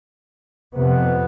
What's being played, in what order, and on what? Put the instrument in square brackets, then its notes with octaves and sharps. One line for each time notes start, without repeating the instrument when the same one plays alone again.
[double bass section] F2 C3 B3